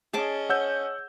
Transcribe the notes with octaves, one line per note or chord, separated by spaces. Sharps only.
C#4 G#4 D#5 A5 D6
C#5 F#5 E6 G6